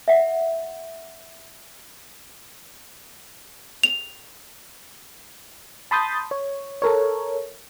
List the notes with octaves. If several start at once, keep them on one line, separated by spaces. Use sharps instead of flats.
E5 F#5
F7
A5 B5 C6 D#6 G6 A6
C#5
A4 A#4 C#5